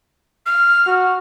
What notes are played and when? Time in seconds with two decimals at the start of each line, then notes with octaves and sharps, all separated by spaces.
0.46 F6
0.87 F#4